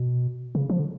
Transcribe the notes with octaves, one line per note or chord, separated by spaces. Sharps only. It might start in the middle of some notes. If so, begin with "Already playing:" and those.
Already playing: B2
C#3
F3
D3